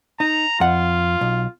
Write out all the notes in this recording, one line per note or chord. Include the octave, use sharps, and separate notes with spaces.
D#4 A#5
F2 F4 F#5
B1